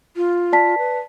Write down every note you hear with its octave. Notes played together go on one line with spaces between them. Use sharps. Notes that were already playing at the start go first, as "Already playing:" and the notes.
F4
D5 A5 B6
B4